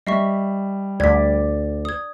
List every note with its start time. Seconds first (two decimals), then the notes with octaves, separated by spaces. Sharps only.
0.07 G3 D#5 E5 C#6 C7
1.00 D2 D5 G#6 B6
1.85 D#6 G#6